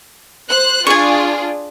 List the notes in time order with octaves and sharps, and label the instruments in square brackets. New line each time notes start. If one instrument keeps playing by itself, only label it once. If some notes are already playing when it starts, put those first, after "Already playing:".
[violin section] C5 F#6
[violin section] D4 F4 G#4 [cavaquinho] G#5 C#6